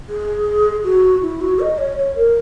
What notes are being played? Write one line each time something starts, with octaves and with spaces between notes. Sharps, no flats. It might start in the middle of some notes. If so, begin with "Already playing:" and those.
G#4
F#4
E4
F#4
D#5
C#5
C#5
A#4